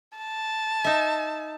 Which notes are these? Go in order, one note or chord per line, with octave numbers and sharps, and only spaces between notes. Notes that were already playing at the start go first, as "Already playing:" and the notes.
A5
D#4 E5